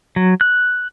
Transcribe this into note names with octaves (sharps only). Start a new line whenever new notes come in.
F#3
F#6